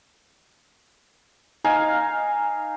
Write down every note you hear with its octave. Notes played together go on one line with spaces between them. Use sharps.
D#4 F5 G#5